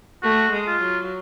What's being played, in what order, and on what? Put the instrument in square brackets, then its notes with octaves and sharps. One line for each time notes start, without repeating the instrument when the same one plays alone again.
[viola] A3 [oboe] F#4
[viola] G#3
[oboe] F4
[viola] F#3